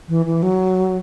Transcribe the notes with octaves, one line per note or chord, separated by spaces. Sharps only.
E3
E3
F#3